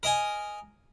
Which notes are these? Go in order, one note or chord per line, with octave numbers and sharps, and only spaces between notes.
A#4 D#5 G#5